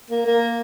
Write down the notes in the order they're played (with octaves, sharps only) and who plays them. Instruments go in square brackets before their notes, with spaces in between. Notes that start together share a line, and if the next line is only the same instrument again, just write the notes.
[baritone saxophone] A#3
A#3